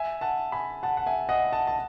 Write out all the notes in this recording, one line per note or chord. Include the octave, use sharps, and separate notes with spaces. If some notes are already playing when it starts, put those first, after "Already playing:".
Already playing: E5 G#5
F#5 A5
G#5 B5
F#5 A5
F#5
E5 G#5
D#5 F#5
F#5 A5
A5